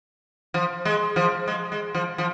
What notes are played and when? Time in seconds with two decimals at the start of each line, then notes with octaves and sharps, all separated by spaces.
0.54 F3
0.85 G#3
1.16 F3
1.48 G#3
1.72 G#3
1.95 F3
2.18 F3